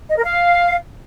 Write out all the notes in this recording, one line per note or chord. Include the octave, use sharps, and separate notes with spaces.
D#5
A#4
F5